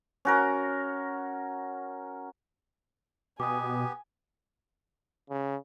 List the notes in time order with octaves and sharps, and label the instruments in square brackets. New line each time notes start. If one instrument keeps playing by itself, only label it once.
[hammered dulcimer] C#4 F#4 A#4
[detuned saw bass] B2 [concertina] B3 G4 [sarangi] G#5 [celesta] D6 D#6
[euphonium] C#3